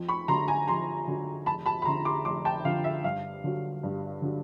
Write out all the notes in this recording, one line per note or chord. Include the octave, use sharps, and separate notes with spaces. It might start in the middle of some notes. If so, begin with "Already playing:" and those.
Already playing: F2
B5 C#6
D3 F#3 A#5 C6
G#5 A#5
F2 A#5 C6
D3 F#3
F1 A5 B5
A5 B5
B5
F2 D3 A#5 C6
C6 D6
F1 C6 D6
G5 A5
F2 D3 F5
E5
G2 F5
D3 F#3
G2
D3 F#3